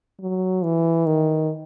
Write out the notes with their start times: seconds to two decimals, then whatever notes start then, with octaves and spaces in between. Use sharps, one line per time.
0.20 F#3
0.64 E3
1.06 D#3